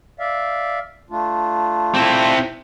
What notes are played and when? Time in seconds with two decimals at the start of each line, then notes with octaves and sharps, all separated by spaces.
0.19 D5 E5 F5
1.10 A3 D4 F4
1.94 C4 E4